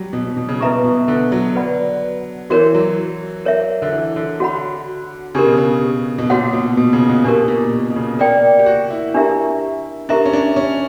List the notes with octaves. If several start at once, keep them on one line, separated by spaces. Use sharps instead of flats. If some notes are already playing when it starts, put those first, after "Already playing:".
Already playing: F#3 G3
B2
B2
B2
C#3
B2 E4 B4 E5 A#5 C#6
B2
D3
F#3
B4 D5 F#5 B5
E3 F#4 A#4 C#5
F#3
A#4 C#5 E5
D3
E3
D3
F#4 C#5 F#5 B5
C#3 D4 G4 A#4
B2
C#3
B2
A#2 F#4 C#5 F#5
B2
B2
C#3
B2
B2 D4 G4 A#4
B2
A#2
B2
C#3
A#3 A#4 D5 G5
G4
F#4
E4
D4 G4 A#4 E5 A#5
D4 G4 A#4 E5 A#5
C#4
D4
C#4